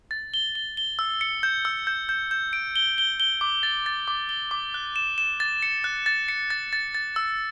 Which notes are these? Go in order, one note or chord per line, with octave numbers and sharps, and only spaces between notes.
A6
G7
G7
G7
E6
C#7
G6
E6
G6
G6
G6
D7
G7
G7
G7
D6
A6
A6
D6
G7
D6
F#6
E7
E7
A6
C#7
F#6
A6
C#7
A6
A6
A6
E6